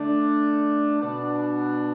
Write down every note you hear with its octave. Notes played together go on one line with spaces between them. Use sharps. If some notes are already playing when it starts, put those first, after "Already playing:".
Already playing: D3 A3 D4
B2 B3 D4